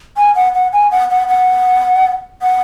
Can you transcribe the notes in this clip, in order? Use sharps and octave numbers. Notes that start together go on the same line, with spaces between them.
G#5
F#5
F#5
G#5
F#5
F#5
F#5
F#5